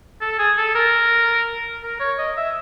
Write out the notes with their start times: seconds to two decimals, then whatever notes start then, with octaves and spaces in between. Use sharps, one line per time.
0.21 A4
0.38 G#4
0.57 A4
0.75 A#4
1.83 A#4
2.00 C#5
2.18 D#5
2.37 E5